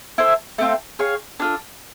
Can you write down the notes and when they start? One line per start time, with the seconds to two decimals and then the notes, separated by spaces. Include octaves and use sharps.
0.18 E4 A4 C5
0.58 A3 C4 F4
0.99 G#4 C#5 F5
1.40 D4 F4 A4